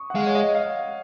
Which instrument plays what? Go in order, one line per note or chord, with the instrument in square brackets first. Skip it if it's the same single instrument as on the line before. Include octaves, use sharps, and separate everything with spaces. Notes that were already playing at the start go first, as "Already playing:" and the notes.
Already playing: [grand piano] C#6 D#6
F#5
[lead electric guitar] G#3 [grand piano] F5
[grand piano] C#5
D#5
F5